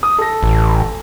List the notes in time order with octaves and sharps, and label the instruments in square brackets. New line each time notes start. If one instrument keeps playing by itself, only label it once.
[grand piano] D#6
A4 A#6
[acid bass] A1